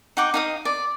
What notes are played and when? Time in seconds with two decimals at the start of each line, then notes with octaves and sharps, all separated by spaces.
0.17 D#4 F#5 G5 D6
0.34 D#4 F5 D#6
0.65 D5